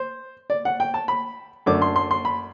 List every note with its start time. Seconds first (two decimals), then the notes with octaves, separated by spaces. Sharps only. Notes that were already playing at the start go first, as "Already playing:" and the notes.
Already playing: C5
0.50 D5
0.65 F#5
0.80 G5
0.94 A5
1.08 B5
1.66 F#2 D3 A3 D4 D6
1.82 C6
1.96 C6
2.11 C6
2.25 B5